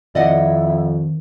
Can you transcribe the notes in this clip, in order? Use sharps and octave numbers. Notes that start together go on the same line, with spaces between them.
F2 D#3 E4 D5 D#5 F#5